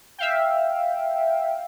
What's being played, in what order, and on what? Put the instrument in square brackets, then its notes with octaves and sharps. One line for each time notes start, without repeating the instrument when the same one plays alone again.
[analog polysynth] E5 F5 G5